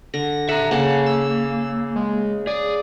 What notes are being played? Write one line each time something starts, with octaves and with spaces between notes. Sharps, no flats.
D3 A#6
A4 E5 F#5 A#5
C#3 A#3 F#5 A5
E6
G#3
G#4 D5